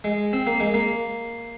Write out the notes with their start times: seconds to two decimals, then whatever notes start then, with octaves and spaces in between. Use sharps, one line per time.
0.04 G#3
0.33 C4
0.47 A#3
0.60 G#3
0.74 A#3